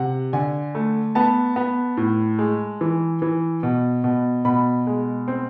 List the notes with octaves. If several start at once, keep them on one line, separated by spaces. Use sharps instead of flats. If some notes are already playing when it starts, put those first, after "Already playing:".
Already playing: C3 F#5
D3 G#5
A3
B3 A5
B3
A2
G#3
E3
E3
B2
B2
B2 B5
G#3
C4